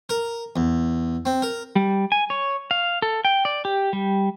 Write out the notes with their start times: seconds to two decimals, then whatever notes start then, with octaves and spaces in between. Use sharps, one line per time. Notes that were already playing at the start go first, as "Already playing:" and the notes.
0.09 A#4
0.56 E2
1.25 C4
1.42 A#4
1.75 G3
2.12 G#5
2.30 C#5
2.71 F5
3.02 A4
3.25 G5
3.45 D5
3.65 G4
3.93 G3